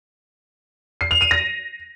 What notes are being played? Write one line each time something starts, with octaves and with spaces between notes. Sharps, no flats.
C7
F7
D#7
A#6